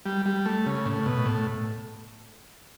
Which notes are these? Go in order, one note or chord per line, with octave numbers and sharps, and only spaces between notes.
G3
G3
A3
C#3
A2
B2
A2